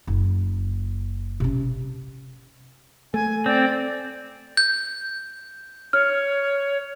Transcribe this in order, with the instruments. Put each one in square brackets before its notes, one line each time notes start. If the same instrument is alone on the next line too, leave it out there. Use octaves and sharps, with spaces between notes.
[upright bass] F#1
C3 C#4
[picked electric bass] A3 [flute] G#5
[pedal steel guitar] C4 [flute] D5
[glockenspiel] G6
[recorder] C#5 [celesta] F6